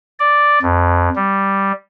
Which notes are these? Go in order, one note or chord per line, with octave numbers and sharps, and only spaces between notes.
D5
F2
G3